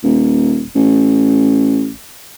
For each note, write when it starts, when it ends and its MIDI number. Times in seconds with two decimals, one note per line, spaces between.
0.03 0.63 27
0.75 1.90 33